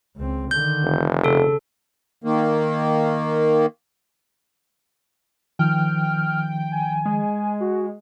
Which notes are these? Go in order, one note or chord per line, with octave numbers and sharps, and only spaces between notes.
C#2 C4
D3 D#3 G6
F1
C#3 A4
D#3 A#3
D#3 F3 G5 F6
G#5
G#3
F#4